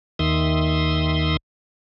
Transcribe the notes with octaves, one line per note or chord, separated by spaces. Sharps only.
D#2 D#3 E5 C6 D#6